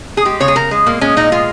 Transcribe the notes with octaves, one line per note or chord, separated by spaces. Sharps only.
G#4
G#3 G4
C#3 C#5
G#4
C#3 A#4
G#3
A#2 A#3
G#3 C#4
A#2 D#4
G#3 F4